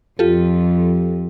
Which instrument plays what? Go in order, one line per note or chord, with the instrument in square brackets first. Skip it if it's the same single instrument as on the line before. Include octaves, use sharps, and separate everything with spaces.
[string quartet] F2 [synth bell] F4 G4 A4